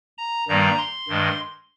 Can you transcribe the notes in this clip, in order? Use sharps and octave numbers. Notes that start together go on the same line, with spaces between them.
A#5
G2 D#3 G3 A#3 A#5
C6
G2 D#3 G#3